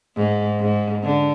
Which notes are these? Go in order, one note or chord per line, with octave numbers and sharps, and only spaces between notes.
G#2
G#2
D3